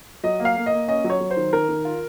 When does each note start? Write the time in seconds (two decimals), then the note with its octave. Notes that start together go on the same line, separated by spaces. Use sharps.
0.23 F#3 D#5
0.40 A#3
0.45 F5
0.56 A#3
0.66 D#5
0.72 A#3
0.88 C#4 D#5
1.04 F#3
1.10 C#5
1.20 F#3
1.31 C5
1.37 D#3
1.53 D#3 A#4
1.69 D#3
1.85 F4